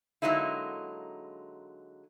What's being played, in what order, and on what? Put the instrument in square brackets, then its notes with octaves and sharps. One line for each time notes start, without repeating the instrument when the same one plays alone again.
[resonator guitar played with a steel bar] D3 F#3 G#3 A#3 D#4 E4